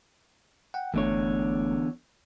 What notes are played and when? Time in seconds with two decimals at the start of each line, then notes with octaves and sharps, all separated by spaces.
0.74 F#5 G5
0.94 G1 E2 D3 A3 C#5